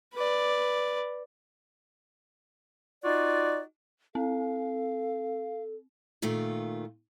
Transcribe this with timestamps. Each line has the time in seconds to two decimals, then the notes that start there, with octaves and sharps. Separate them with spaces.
0.14 B4 D5
3.04 D#4 F4 F#4 D5
4.15 C4 A4 F5
6.22 A#2 D#3 A3 F4